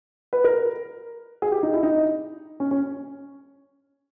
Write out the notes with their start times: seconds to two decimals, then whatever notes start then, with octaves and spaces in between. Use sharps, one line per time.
0.33 B4
0.44 A#4
1.42 G#4
1.52 G4
1.63 D#4
1.73 E4
1.83 D#4
2.60 C#4
2.71 C#4